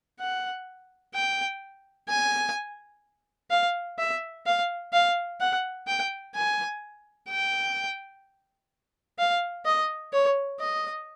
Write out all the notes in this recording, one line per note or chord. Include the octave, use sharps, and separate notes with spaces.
F#5
G5
G#5
F5
E5
F5
F5
F#5
G5
G#5
G5
F5
D#5
C#5
D#5